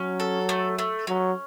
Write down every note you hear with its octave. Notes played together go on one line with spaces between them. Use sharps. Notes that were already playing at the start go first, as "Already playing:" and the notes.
Already playing: F#3 C#4
A4
A3
A3
F#3 C#4